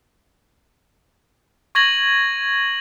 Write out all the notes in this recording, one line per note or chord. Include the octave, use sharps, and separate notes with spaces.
C#6 G#6 A#6 F#7